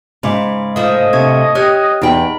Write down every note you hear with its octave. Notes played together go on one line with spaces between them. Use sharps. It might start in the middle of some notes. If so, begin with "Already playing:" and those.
G#2 C#3 B5 C6 D6
A2 F3 D#5 F5 D#6
C3 D4 C#6 G#6
G4 C#5 F6 F#6 G#6
E2 D#4 G#4 G5 B5